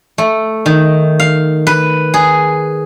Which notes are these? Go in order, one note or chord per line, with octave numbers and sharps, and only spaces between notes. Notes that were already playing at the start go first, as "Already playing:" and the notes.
A3
D#3
F5
B4
G#4